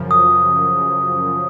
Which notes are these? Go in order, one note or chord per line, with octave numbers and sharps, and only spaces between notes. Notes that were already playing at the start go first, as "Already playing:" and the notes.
Already playing: F#2 C#3 F3
D#6